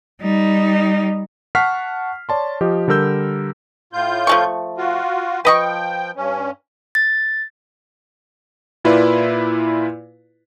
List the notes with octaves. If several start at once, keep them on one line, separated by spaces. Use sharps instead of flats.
G3 D#4
F#5 A5 C#6 F6 B6 C7
C#5 D5 A5 C6
F3 G4 D#5
D3 G3 A#4 E6 G6
A2 F4 G6
F3 A3 C#6
F4 F#4
F3 B4 D#5 G5 C#6
G2 C#4
A6
A#2 E4 F4 B4 D5